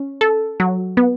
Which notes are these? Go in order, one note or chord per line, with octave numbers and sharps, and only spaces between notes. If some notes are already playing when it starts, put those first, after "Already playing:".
Already playing: C#4
A4
F#3
B3